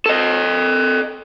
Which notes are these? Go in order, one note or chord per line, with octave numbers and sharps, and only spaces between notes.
A4 D#5